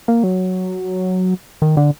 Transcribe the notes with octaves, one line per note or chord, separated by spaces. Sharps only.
A#3
F#3
D#3
D3